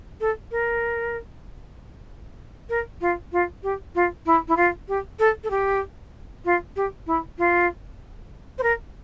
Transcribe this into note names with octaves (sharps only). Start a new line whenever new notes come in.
A4
A#4
A#4
F4
F4
G4
F4
E4
E4
F4
G4
A4
A4
G4
F4
G4
E4
F4
C5
A#4